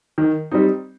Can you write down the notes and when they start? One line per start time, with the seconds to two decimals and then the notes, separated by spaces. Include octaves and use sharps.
0.18 D#3
0.51 G3 C4 D#4